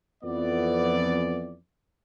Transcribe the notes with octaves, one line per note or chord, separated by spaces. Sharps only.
F2 E3 B3 D5